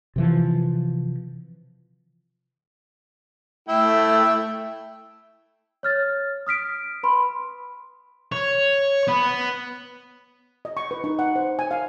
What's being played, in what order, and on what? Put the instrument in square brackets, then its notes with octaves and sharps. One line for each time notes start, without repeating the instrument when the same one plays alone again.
[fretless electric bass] C3 E3 F3
[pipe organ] A3 [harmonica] E4 E5 G5
[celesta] C#5 F6 A6
D#6 F6 B6 D7
B4 B5 C6
[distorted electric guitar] C#5
B3
[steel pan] D#5
C#6
B4
D#4
F#5
C5
G#5
F5